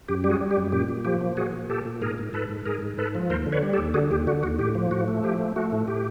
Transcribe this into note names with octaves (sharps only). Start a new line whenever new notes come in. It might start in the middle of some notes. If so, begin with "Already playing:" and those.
F#2 G4
G3 G4
F#4 G#4
G3
G4
F#2
A#2 G4
A#2
F3 G4
A#2
A#2 F#4 G#4
A#2
A#2 G4 A4
A#2
G#2 G#4 A#4
G#2
G#2 A4 B4
G#2
G#2 G#4 A#4
G#2
G#2 A4 B4
F3
D#2 A#4 C5
D3
B4 C#5
G3
G4 A4
D#2
D3 F#4 G#4
D#2 G4
D3 F#4
D#2 F#4
A2 G4
F3
A2 F#4
A3
F3 G4
A3
A3 F#4
A2
A2 G4